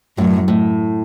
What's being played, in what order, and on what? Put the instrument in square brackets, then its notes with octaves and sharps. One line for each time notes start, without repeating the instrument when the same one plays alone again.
[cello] F#2 [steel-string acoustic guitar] A2
[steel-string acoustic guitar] A2